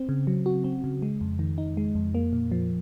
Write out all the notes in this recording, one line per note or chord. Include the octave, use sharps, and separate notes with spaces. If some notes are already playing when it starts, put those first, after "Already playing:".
Already playing: C4
C#3
F#3
F#4
C4
C#3
G#3
F2
D#3
D#4
G#3
F2
A#3
A#2
F3